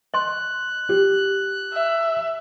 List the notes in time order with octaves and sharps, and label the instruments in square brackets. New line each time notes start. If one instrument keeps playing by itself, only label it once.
[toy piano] D#5 C6 [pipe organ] F#6
[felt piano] G4
[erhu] E5